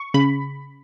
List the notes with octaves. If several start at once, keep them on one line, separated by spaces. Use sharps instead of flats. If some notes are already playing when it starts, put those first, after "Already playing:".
Already playing: C#6
C#3 B5